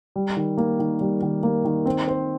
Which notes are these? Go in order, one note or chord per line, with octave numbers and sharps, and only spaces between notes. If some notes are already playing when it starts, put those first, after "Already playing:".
G3
D#3
A#3
D#3
G3
D#3
A#3
D#3
C4
C5